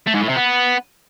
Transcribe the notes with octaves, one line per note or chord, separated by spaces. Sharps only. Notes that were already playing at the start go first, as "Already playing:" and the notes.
A3
G#2
A2
C3
B3